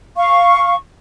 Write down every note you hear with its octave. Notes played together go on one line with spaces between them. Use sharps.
F5 C#6